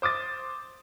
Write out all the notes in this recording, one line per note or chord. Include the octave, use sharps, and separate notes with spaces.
C5 D6 D#6 A6